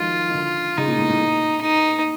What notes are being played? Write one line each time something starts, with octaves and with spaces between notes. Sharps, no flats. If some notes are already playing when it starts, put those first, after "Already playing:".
Already playing: D#3 F3 F#3 G#3 F4
D#3
D3
C#3 D#4
A#2
A2
A2
A#2
D#4